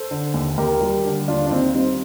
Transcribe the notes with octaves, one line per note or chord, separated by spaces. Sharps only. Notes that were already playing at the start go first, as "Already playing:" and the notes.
Already playing: A4 C5
D3
D#2
D#2 G4 A#4
G3
D3
D#2 D4 F4
D4
D#2 C4 D#4
G3 C4 D#4